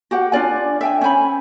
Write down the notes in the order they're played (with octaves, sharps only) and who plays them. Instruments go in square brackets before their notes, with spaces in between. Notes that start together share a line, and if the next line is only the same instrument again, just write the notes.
[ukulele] F#4 G4 F#5 G5
D4 F4 D5 G#5
E5 G5 G#5
C#4 C5 G#5 B5